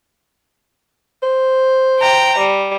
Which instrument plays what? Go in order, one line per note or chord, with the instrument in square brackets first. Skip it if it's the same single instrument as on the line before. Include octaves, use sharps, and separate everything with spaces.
[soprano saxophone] C5
[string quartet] G5 A#5
G3